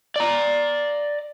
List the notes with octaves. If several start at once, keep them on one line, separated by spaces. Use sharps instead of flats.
D5 A#5